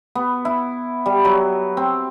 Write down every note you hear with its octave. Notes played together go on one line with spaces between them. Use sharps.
B3
E4
G3
F#3
C4